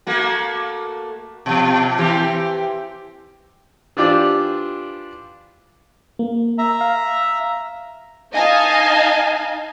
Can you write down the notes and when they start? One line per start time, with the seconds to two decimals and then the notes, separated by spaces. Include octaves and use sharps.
0.07 A3 A#3 F#4
1.46 B2 F3
1.97 E3 C4 G4
3.97 E3 D4 F4 G4 C5 D5
6.19 A#3
6.58 E5 A#5
6.81 F5
8.33 D#4 D#5 F5 G#5 A5